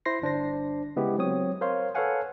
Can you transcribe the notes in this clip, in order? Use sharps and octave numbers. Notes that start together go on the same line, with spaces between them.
E4 C5 C6 A#6 C7
G1 D4 C5 A#6
C#3 G#3 B3 E4 G4
F#3 C4 C#5 D#6
A#4 C5 C#5 F5 C6
A4 B4 C#5 F5 F#5 G#5